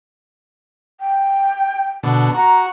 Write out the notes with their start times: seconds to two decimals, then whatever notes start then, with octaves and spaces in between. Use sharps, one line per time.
1.00 G5
2.03 B2 D3
2.34 F#4 A#5